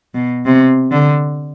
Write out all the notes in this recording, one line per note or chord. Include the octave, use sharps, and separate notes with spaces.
B2
C3
D3